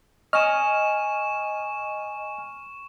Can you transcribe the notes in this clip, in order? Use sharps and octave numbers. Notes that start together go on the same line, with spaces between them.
D#5 G#5 C#6 F6 E7